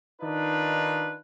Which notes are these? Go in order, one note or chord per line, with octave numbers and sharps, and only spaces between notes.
D#3 D4 D#4 F4 B4